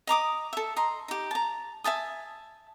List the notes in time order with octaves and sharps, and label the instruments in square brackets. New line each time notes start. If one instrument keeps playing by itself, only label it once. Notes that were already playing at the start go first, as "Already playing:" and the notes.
[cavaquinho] D#5 A#5 D6 D#6
A4 E5
D#5 A#5 C6
D#4 G4
A5 A#5
E5 G#5 A5 D#6